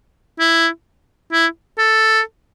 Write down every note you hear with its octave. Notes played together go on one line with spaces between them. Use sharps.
E4
E4
A4